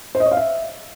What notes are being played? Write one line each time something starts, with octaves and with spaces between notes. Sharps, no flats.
C5
D#5
C#5
F5
E5